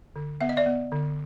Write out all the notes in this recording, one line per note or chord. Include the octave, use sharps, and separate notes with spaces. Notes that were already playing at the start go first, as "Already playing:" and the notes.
D3
B3 E5
D#5
D5 E5
B3
D3